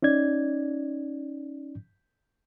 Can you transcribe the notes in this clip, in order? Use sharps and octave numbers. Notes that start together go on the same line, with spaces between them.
C#4 D#4 D5 G#6